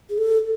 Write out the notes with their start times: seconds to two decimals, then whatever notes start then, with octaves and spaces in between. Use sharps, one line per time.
0.10 G#4
0.18 A4